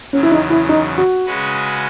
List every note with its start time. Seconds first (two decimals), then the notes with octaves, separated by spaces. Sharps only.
0.13 E2 C#3 F#3 C#4
0.23 E4
0.31 D#4
0.50 E4
0.69 D#4
0.98 F#4
1.26 C#3 G#3 C#4 F#4 B4